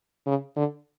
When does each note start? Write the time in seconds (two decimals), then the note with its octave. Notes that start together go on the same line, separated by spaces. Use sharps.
0.27 C#3
0.56 D3